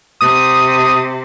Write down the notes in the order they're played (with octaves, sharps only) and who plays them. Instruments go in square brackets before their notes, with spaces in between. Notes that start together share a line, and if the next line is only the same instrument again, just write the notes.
[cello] C3 [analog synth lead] D#6